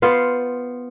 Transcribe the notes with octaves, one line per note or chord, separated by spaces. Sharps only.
B3 F4 C5